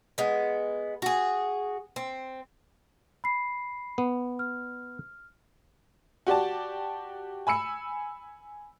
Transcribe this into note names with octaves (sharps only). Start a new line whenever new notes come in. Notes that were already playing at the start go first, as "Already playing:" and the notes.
G#3 B3
F#4 G#4
C4
B5 C7
B3
F6
F#4 G4 D5 A5
G#5 B5 E6 C#7